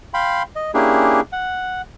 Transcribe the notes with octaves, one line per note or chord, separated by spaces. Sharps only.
F5 G5 B5 C6
D#5
A#3 C#4 D4 E4 G4 G#4
F#5